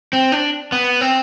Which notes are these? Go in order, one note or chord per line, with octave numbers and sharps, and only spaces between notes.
C4
D4
B3
C4